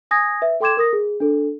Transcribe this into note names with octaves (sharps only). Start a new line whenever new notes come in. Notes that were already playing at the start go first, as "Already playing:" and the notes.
G#5 D#6 G#6 A#6
B4 E5
A4 G5 C6 D6 G#6 E7
A#4 D#6 A#6
G#4
D4 A4